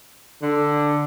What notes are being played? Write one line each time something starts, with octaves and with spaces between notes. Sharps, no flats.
D3